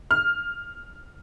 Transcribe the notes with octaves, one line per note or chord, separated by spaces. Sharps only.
F6